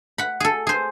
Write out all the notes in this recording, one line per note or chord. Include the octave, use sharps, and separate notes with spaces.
F#5 B5
G#4 A4
G#4 C5